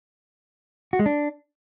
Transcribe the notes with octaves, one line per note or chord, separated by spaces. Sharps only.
F#4
G#3
D4